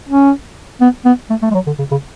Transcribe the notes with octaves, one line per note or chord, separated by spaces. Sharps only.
C#4
B3
B3
A3
A3
G#3
F#3
D3
C#3
C#3